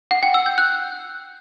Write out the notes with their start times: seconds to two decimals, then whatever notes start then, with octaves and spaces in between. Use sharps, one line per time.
0.11 F#5
0.23 G5
0.34 E6
0.46 G6
0.58 F#6